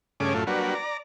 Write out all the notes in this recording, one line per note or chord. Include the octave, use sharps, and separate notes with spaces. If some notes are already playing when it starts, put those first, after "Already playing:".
G2 C#3 A3 C#4 G#4 D6
F#2 A2 A3 F4
F#3 G3 A#3 D4 F#4 B4
D5 A#5